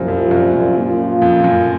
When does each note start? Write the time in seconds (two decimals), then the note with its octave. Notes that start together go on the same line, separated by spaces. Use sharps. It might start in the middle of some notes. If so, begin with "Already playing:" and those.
Already playing: C2 F#2 A#2 F3
0.08 F2
0.31 F#2
0.53 F#2
0.77 A#2 F3 A#3 C#4 F4
1.22 F2
1.39 F2
1.44 F#2